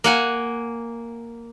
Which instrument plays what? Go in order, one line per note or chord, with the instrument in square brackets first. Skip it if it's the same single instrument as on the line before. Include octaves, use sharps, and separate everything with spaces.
[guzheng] A#3 F#5 G#5